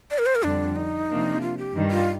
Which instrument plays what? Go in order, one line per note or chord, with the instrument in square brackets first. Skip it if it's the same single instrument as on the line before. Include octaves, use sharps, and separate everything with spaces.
[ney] D5
A#4
C5
A#4
[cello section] F2 D3 G3 [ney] D4
[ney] D#4
[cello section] C3 F3 A#3 D4
[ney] F4
G4
[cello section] G2 D#3 G3
[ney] F4